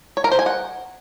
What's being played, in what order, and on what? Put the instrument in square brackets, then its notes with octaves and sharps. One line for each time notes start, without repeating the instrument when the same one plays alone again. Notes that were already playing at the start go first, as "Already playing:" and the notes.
[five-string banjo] C#5
A#4
C5
G#5
F#5